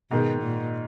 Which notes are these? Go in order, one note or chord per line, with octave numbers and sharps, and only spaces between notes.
G#2 B2 D#3 G#3
A#2